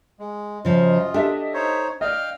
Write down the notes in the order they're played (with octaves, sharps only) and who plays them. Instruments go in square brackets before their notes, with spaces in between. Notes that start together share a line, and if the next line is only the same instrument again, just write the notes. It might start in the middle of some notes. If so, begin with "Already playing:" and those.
[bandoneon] G#3
[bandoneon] F#2 F4 [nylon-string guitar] C#3 F3 [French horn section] D#5
[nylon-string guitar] D4 [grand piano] G4 A4 E5
[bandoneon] D#4 C5 C#5
[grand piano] D5 D#5 [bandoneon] F5 G5 F6